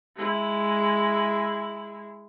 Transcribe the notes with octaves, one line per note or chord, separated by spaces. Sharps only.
G#3 E4